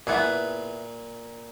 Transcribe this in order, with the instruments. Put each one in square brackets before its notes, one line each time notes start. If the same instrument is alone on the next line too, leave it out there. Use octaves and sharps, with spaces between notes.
[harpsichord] A#2 [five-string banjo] B3 E4 G#4